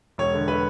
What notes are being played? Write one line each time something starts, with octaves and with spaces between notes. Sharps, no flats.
E1 C#5
D3
B4